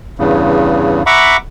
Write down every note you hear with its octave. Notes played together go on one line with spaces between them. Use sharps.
E2 G2 C#3
E5 F#5 A#5 B5 C#6 D6